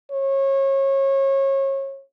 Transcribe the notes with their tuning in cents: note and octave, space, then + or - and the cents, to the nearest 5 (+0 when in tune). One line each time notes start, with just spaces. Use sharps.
C#5 -30